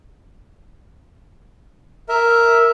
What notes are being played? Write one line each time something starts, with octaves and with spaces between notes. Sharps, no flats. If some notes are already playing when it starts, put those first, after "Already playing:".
A#4 E5